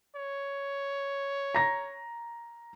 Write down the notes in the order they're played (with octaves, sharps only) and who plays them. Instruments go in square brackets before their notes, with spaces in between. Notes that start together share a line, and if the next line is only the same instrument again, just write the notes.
[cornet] C#5
[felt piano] A#5 A#6